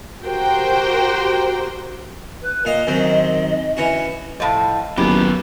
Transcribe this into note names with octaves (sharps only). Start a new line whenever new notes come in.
F#4 G4 A#4 C5 G5
B4
A#2 D#5 F5 D#6
F#2 D#3 C4
E3 C#4 F#4
A2 F3 D#5 F5 A5
F#1 F#2 B3 G4 B5